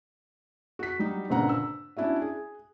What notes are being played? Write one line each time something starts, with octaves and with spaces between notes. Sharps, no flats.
F#4 B6
F#3 G3 D#4
G1 A#2 C#3 C4 F#5 A#5
E6
C#4 D4 E4 F#4 E5
G#4